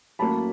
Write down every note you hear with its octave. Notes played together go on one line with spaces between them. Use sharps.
A2 F#3 A#3 C#4 A5 B5